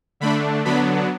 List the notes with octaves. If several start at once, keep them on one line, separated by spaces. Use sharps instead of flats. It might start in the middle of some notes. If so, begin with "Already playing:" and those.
D3 A3 D4 B5
D3 F#3 B3 D4 B5